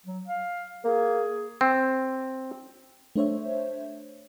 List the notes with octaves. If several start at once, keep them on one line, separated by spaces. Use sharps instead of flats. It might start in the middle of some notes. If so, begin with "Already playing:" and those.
F#3
F5
A#3 G#4
C4
A3 D4 C5 C#5 E5